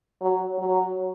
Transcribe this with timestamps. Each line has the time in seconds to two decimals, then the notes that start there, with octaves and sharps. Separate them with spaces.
0.21 F#3
0.58 F#3